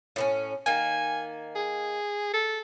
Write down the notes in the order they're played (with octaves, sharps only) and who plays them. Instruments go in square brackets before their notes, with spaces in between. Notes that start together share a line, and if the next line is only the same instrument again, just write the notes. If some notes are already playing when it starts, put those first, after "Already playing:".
[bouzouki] A2 B3 C#4
[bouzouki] D#3 A#3 [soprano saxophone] G#5
[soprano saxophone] G#4
A4